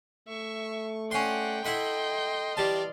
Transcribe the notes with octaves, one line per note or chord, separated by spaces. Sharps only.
A3 E5 C#6
C#4 D5 F#5 G5 C6
E4 A4 D#5 F#5 B5 C6
E3 G3 D5 F5 A5